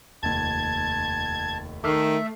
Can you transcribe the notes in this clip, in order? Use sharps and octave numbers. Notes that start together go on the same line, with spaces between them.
F1 D#2 A5 G#6
D#3 A3 E5 D6 F6 C7